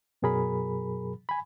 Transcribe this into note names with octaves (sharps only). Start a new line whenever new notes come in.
F#2 B2 F#3 G#4 A#4 B5
G#5 B5